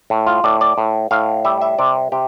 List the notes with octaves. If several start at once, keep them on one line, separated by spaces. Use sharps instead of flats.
A2
F4
A2 D5
D5
A2
A2 F5
G3 E5
E5
C3 D5
C3 G4